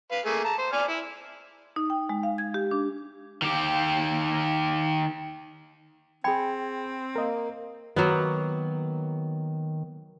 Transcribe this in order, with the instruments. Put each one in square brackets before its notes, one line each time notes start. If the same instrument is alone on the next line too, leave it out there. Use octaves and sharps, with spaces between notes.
[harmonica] B4 F5
A3 A#3 G#4
A5 A#5
C5
D5 G#5 F6
E4
[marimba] D#4
G5
G#3
F5
G#6
G4
D4
[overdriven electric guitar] D#3 G4
[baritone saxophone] C4 [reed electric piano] G#4 G#6 [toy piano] G5 B5
[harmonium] A#3 [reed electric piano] A#4 D#5
[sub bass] D#3 [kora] F#3 A#3 B3